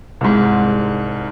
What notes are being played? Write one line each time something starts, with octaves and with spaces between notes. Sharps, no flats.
C2 G#2